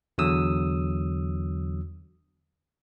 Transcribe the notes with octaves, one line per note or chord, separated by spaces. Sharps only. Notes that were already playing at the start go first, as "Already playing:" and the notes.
E2 D3 F#3 D#6 E6